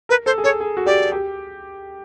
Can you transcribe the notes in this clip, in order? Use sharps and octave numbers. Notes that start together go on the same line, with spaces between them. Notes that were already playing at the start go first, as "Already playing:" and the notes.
A#4 B4
A4 C5
G#4
A4 C#5
G#4
F#4
G4 D5
G4